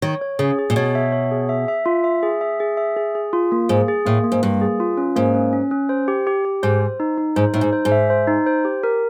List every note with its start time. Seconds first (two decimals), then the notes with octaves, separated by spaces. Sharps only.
0.02 D#3 C#5
0.22 C#5
0.39 C#3 G#4
0.59 G#4
0.70 A#2
0.76 B2 C#5
0.95 E5
1.12 C#5
1.31 G#4
1.49 E5
1.68 E5
1.86 F4
2.04 E5
2.23 G#4
2.41 E5
2.60 G#4
2.77 E5
2.96 G#4
3.15 G#4
3.33 F4
3.52 A#3
3.69 G#2 G#4
3.88 G#4
4.06 A2 A#3
4.24 A#3
4.32 G#2
4.43 G2 A#3
4.61 G#4
4.80 F4
4.98 C#4
5.16 G#2 A#3
5.34 C#4
5.53 C#4
5.71 C#4
5.89 C5
6.08 G4
6.27 G4
6.45 G4
6.63 G#2 C5
6.81 C5
7.00 D#4
7.18 D#4
7.36 G#2 C5
7.54 A2 D#4
7.61 G#2
7.73 C5
7.85 G#2
7.92 E5
8.10 C5
8.27 D#4
8.46 C5
8.65 G4
8.83 A#4